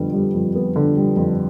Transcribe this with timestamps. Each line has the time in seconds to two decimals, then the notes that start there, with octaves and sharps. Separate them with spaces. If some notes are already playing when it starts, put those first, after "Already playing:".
Already playing: F2 D3 G3 B3
0.14 G3
0.34 F2
0.55 B3
0.76 D3
0.96 G3
1.17 F2